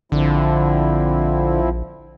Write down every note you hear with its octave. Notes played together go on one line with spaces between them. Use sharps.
A#1 D3 F3 C4 E4